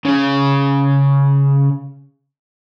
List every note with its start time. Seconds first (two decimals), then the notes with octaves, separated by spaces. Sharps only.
0.05 C#3 C#4